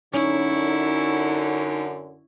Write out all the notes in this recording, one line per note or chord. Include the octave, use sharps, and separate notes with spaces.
F#2 D3 C#4 D#4 E4 C#6